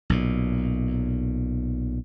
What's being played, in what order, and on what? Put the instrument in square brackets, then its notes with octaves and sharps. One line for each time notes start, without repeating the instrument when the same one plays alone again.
[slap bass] B1 A#2